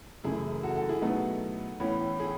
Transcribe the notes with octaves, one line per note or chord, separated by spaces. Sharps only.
F#1 F#2 E3 A3 E4 G#4
F#4 A4
F#4 A4
E4 G#4
B2 F#3 A3 B3 D#4
A2 E3 B3 C#4 E4
E4 G#4